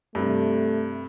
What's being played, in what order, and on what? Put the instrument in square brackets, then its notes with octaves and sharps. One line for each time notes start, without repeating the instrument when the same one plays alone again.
[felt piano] G2 C3 [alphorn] A3